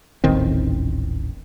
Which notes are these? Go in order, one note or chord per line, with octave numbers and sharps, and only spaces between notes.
D#1 A1 D#3 C4